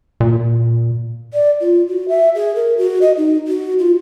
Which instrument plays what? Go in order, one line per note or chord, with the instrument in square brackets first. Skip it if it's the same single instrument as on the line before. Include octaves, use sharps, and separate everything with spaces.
[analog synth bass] A#2
[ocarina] D5
F4
F#4
E5
G#4
A#4
F#4
D#5
D#4
F#4
F4